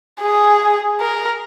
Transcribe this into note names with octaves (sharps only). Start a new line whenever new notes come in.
G#4
A#4